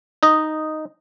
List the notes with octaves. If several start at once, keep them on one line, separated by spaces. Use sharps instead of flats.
D#4 D#5